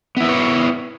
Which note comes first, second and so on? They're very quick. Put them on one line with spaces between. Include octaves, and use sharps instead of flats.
B3 E4 B4 C#5